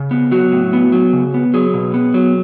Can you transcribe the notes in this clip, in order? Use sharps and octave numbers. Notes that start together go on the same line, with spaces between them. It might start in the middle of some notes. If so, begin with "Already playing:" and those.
Already playing: C#3
B3
F#3 F#4
A2
B3
F#3
C#3
B3
F#3 G#4
B2
B3
F#3